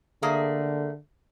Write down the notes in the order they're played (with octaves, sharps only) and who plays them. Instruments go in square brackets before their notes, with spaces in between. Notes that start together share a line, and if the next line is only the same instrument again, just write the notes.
[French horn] D3 [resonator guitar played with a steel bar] A3 A#3 G#4